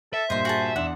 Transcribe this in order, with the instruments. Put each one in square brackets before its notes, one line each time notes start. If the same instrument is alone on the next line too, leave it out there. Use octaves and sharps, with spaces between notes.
[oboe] A4 [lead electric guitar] E5
[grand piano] G2 A#2 [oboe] C5 [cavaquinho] D#5 C6
[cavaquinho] F#4 G#4 A5
[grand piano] E2 D4 C6 [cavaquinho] F#5